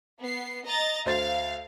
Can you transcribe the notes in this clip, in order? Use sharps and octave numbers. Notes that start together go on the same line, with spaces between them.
B3 C7
D#5 A#5 A6
D2 C5 F5 A6